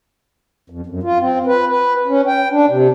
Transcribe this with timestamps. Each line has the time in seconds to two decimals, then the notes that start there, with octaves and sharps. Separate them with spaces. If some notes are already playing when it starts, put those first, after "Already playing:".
0.70 F2
0.86 F#2
1.03 F4
1.20 C4
1.46 B4
1.69 B4
2.07 C#4
2.27 G5
2.52 D4
2.69 C3